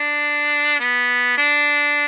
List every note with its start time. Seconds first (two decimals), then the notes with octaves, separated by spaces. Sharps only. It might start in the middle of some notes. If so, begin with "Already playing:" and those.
Already playing: D4
0.80 B3
1.38 D4